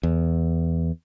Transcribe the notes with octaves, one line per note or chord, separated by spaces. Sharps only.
E2